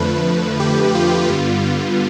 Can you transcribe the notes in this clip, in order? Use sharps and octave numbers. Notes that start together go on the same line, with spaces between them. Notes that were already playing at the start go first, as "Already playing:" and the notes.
Already playing: F2 D3 F3 A3 B4
G4
F4
G2 D3 G3 B3 F4
F4